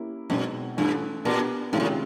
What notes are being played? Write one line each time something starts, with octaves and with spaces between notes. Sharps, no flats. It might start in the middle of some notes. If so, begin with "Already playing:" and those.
Already playing: A#3 C#4 E4 G4
F#2 B2 G#3 C4 D#4
G2 E3 A3 C#4 F4
A#2 B3 D4 G4 A#4 D5
G#2 C3 D#3 G#3 C#4 F4
A2